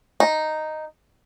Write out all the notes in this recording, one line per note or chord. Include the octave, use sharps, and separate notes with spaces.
D#4